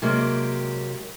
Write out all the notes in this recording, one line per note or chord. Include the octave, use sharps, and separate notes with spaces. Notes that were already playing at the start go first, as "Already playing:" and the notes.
C3 F#3 G#3 A#3 G4